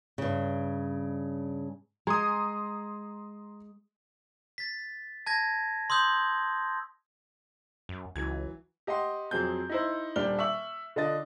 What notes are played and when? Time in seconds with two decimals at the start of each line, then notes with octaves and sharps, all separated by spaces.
0.18 G2 C#3
2.07 G#3 A#5 C6 D#6
4.58 A6 B6
5.26 A5 G#6 A#6
5.90 C6 D#6 E6 G6
7.89 F#2
8.16 C#2 E3 F#3 G#6
8.87 G4 D#5 F#5 C6
9.31 F2 F#3 C4 G#4 G6
9.70 D#4 E4 C5
10.16 D#1 G3 D4 F6 G7
10.39 E5 C#6 F#7
10.96 D3 D4 F4 D#5 A6